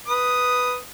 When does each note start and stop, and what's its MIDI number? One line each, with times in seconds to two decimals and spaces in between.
0.08 0.77 71
0.08 0.77 87